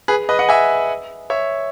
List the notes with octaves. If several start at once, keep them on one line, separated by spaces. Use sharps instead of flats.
G#4 B4
B4 D#5
D#5 F#5
E5 G#5
C#5 E5